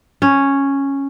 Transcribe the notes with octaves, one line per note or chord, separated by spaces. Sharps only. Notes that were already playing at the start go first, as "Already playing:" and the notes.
C#4